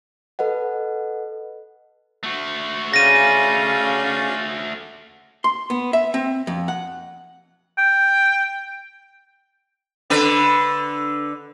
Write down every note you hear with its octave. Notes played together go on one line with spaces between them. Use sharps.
A4 B4 D#5 F#5
A3 F#4
C#3 A3 C#4 F#4 D5 F5 A#6 D#7
C6
B3
E5
C4
F2
F#5
G5
D3 B4